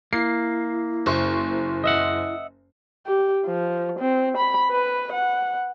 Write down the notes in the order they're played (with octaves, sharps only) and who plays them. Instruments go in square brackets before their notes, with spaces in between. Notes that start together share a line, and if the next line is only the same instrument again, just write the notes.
[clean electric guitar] A#3 [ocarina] E4 [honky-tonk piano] C7
[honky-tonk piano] F#1 C5 C#6
[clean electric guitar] D#5 E5 F#5
[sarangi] G4
F3
C4
B5
B4
F#5